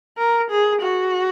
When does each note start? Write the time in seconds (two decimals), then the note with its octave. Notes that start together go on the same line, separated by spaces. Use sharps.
0.18 A#4
0.50 G#4
0.82 F#4